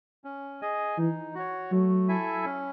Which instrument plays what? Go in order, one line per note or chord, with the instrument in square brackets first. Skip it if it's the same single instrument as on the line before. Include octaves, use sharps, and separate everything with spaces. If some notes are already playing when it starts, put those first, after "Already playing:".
[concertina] C#4
G#4 D#5 G#5
[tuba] E3 [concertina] D#4
[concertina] F#4 C#5
[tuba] F#3 [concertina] A3
[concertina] E4 A4 E5 G#5
C#4